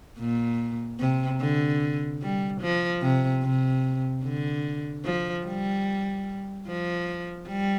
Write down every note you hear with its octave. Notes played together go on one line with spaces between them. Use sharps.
A#2
C3
D3
G3
F3
C3
C3
D3
F3
G3
F3
G3